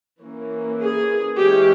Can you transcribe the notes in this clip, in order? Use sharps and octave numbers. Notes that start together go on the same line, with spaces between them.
E3 A#3 C#4
G#4
E3 G#3 C#4 G4